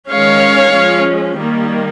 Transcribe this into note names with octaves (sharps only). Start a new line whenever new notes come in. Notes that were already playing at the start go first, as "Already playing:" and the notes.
D#3 G#3 C#4 C#5 F5
F3 G#3 C#4
D#3 G3 A#3